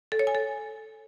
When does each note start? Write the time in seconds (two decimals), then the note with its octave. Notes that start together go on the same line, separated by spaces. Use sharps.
0.12 A4
0.19 C#5
0.27 G#5
0.35 A4